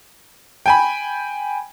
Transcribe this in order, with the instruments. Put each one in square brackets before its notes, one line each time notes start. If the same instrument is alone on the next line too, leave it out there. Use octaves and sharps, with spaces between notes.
[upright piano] G5 G#5 B5